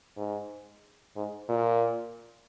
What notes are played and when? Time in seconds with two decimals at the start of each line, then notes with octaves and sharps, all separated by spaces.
0.17 G#2
1.16 G#2
1.49 A#2